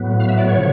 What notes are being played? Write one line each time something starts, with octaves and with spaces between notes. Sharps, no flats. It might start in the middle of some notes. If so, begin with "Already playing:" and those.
Already playing: A2 F#3 B3
F5
E5
D5
C#5
C#3 F3